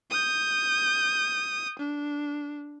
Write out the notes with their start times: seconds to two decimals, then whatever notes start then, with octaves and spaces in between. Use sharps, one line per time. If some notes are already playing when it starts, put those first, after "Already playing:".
0.11 D#6 G6
1.79 D4